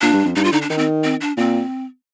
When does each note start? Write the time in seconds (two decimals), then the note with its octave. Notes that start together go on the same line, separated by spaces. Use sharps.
0.01 A#2 D4
0.13 G2
0.25 F2
0.36 G2 D#4
0.44 F4
0.52 D3 D#4
0.62 D4
0.70 D#3 D#4
0.78 C4
1.04 C4
1.21 D4
1.37 A#2 C4